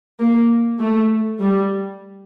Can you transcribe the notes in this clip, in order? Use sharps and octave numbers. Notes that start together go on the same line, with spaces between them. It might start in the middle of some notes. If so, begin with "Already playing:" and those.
A#3
A3
G3